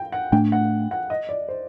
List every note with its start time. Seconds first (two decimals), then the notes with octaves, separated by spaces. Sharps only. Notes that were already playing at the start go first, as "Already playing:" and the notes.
Already playing: G5
0.12 F#5
0.32 A2 A3 D4 G5
0.52 F#5
0.91 F#5
1.10 D#5
1.29 D5
1.49 C5